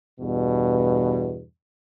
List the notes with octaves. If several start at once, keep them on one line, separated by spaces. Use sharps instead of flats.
E2 G2 B2